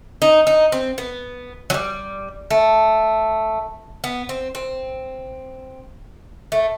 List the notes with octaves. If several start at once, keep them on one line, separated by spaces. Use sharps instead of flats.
D#4
D#4
C4
B3
F#3
G3
A3
B3
C4
C4
A3